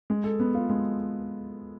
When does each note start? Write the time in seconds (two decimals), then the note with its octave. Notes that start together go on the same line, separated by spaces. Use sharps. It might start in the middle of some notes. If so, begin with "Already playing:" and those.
0.10 G#3
0.24 A4
0.40 B3
0.55 F4
0.69 G#3